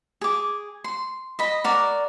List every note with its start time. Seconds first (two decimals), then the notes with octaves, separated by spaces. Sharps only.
0.21 G#4 D6
0.84 C6
1.39 D#5 B5
1.64 F#4 A#4 D5